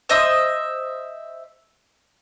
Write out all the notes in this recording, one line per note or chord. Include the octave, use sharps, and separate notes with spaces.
C5 D#5 E5 D#6